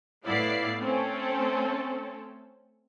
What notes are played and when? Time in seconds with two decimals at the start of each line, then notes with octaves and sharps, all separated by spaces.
0.26 A2 B3 E4 D5 F5 C7
0.78 A3 C4 C#4 A4